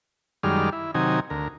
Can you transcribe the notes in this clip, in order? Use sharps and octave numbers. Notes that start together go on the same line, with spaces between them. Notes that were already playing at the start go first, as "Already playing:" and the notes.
F#2 D#3 G3 G#3 D5 F6
E4
C3 D#3 F#3 D#4 G#5
D2 A#4